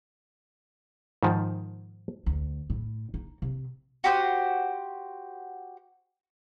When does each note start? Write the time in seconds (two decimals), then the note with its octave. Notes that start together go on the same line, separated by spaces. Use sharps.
1.23 G#2 D#3 F3
2.26 D2
2.70 A2
3.14 D#4
3.42 C3
4.04 F#4 G4 C5 D#6